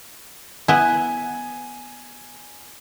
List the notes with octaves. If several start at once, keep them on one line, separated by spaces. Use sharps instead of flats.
B3 E4 G#5